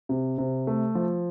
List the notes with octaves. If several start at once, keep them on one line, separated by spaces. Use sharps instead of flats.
C3
C3
A3
F3